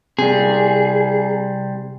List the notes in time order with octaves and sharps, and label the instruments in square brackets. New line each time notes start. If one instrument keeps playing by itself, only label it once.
[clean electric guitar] C3 G3 [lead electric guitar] G#4